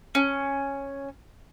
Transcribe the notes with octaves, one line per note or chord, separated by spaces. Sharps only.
C#4